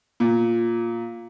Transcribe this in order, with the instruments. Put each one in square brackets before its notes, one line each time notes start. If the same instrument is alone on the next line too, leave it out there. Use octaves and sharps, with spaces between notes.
[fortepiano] A#2